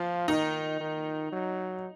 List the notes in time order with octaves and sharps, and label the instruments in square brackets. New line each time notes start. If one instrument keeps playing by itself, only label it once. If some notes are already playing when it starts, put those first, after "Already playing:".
Already playing: [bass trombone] F3 [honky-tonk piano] F4
[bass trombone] D#3 [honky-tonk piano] D#4
[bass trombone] D#3
F#3